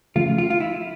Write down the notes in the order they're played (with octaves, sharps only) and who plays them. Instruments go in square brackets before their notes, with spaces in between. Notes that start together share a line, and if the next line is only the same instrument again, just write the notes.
[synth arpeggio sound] C#3 F3 A3 [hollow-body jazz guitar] F4
[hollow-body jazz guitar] F4
F4
E4